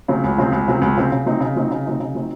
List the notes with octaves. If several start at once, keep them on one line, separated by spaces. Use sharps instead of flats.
C#3 F#3 C4
C#2
C#3 F#3 C4
C#2
C#3 F#3 C4
C#2
C#3 F#3 C4
C#3
F#3 C4 D#4
C#3
F#3 C4 D#4
C#3
F#3 C4 D#4
C#3
F#3 C4 D#4